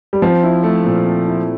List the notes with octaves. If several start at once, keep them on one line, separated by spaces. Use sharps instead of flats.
G3
F3 C4
E4
A3
A#2
C4
E4